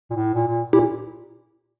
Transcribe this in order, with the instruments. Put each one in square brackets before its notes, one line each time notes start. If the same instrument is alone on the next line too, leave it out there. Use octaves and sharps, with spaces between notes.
[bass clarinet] A#2
A2
A#2
A#2
[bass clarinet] A#2 [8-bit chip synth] E4 G4